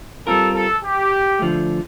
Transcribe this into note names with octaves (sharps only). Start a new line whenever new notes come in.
G3 C4 F4 A4 A#4
A4
G4
D3 F3 A3